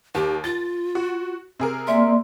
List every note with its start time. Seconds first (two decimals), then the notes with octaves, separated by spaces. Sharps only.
0.15 D#2 G4
0.44 F4 A6
0.95 F#4
1.59 C3 G#4 A#4
1.87 A#3 D5 E5 C6